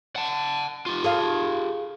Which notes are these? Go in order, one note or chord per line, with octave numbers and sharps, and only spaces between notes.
F#5 A5
F4 G4
G#4 A4 F5